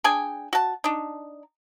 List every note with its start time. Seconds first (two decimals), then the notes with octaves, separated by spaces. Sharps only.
0.04 D4 G#4 G5 G#5
0.53 F#4 A5
0.84 D4 D#4